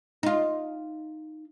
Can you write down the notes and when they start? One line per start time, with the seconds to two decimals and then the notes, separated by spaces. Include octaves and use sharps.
0.23 D#4 F4